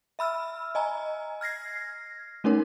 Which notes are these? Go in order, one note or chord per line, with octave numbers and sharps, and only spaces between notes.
E5 B5 E6 F6
D#5 G#5 A#5
F6 G#6 A#6 C7
A3 C#4 D#4 A#4 C#5